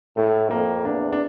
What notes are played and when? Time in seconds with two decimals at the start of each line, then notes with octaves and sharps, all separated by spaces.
0.17 A2 A3
0.51 F2 A#3
0.85 E2 D4
1.13 D4